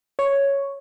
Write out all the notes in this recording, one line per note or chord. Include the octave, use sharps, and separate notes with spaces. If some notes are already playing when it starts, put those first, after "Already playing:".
C#5